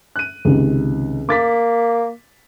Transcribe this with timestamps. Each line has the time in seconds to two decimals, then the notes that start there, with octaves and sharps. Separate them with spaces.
0.16 F#6 D#7
0.45 C#2 C3 D#3
1.29 A#3 D6 A6 B6